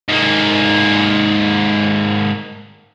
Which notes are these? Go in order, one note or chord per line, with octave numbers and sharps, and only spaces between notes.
G#2 A#3